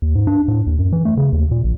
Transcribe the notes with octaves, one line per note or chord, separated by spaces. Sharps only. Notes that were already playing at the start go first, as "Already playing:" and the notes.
D#2
G#2
D4
A2
D#2
F#2
E3
A3
C#3
D#2
A#2
A#1